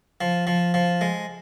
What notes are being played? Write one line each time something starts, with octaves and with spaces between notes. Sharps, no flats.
F3
F3
F3
G#3